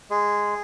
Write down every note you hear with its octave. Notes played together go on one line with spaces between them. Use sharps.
G#3 G#4